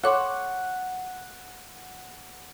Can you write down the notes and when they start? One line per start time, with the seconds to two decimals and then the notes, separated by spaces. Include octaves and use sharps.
0.03 A4 C#5 F#5 C6 D6 F#6